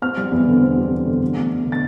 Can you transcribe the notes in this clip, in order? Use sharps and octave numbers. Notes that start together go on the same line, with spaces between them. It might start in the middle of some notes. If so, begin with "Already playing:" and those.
C4 F6
G3
E2
D3
C4
G3
E2
D3
E2
A3
E2
D3
A6